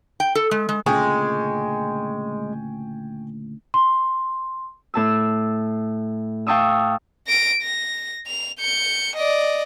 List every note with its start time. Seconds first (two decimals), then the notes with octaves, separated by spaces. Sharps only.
0.20 G5
0.35 A4
0.51 G#3
0.69 G#3
0.86 D2 A#2 C#3 G#3 G5 G#5 C#6
3.74 C6
4.94 A2 A5 E6
6.47 F5 G5 A5 C#6 D#6 E6
7.27 A#6 D7
7.62 A#6
8.27 F7
8.60 G6 C#7
9.16 D5 D#5